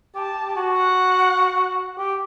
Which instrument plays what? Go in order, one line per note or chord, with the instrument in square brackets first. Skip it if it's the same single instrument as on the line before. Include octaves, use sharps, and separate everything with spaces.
[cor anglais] G4 [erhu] A5
[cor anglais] G4
F#4
[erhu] F#5
[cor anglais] G4